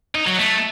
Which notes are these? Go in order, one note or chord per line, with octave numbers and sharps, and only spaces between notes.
D#4
F#3
A3